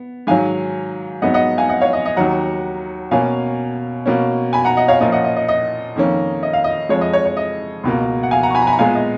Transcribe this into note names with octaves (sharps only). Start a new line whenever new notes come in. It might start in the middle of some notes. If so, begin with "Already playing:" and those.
Already playing: B3
G#2 D#3 F#3 F5 G#5
G#2 F#3 B3 D#5 F#5
D#5 F#5
F5 G#5
D#5 F#5
C#5 F5
D#5
D#5
D#2 D#3 F#3 F#5 A#5
B2 A#3 C#4 F5 G#5
B2 A#3 C#4
G#5 B5
F#5 A#5
D#5 F#5
C#5 F5
A#2 F3 A#3 C#4 D#5
D#5 F#5
D#5
D#5
D#5
F2 D#3 A#3 C#4
D#5
F5
D#5
F2 F3 G#3 C#5
D#5
C#5
C#5
D#5
C#2 B2 A#3
F#5
F5 G#5
F#5 A#5
C#6
G#5 B5
A#5
G#5 B5
A#5
A#2 G#3 B3 F5 G#5
D#5